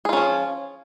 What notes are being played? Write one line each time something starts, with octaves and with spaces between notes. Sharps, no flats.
F3 C#4 F4 G#4